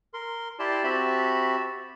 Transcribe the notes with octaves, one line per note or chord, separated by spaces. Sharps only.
A#4 C6
E4 G4 D5 A5 C6
C4 F#4 G4 E5 A5 B5